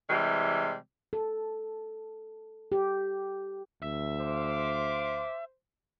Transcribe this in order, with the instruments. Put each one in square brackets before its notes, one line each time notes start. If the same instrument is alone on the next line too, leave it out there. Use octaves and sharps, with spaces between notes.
[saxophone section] C3 E3 G3 G#3
[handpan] A4
G4
[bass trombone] D2 [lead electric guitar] E5
[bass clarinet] C5 [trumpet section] F5 C6 D6